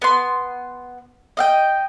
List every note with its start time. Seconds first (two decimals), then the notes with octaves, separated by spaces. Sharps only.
0.02 B3 C6
1.37 D#5 F5 G5